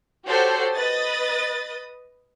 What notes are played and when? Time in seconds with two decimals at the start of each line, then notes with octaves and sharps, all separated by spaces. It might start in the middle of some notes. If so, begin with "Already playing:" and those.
0.25 F#4 G4 A4 C5 C#5
0.74 B4 D#5 D#6 A6